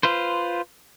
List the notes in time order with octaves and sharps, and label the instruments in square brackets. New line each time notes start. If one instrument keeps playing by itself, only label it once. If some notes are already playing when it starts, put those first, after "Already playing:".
[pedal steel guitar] F4 B4 C5